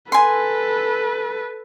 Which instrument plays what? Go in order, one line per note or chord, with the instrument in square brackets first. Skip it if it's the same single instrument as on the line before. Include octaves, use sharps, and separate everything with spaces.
[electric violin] A4 B4 [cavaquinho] G#5 C6